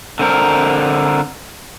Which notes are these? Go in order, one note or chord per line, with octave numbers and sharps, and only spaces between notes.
D3 C4 A#4